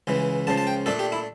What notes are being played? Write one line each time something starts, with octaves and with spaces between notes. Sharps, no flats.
C#2 C#3 E3
C#2 C#3 F3 A5
A5
G5
A#2 A3 D4 A4
G4
E4